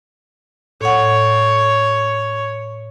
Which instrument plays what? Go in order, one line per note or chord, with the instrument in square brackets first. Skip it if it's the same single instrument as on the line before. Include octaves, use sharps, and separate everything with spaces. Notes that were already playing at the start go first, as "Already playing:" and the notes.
[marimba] A2 F#5 [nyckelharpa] C#5